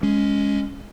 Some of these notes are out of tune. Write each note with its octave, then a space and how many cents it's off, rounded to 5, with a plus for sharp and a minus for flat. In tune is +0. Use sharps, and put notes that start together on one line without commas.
G#3 +0 C#4 +10